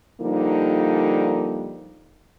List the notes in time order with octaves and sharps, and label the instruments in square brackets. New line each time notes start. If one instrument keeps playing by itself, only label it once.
[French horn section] D3 F3 G3 A#3 D#4